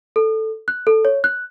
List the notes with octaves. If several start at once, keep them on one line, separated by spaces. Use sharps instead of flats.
A4
F#6
A4
C#5
F#6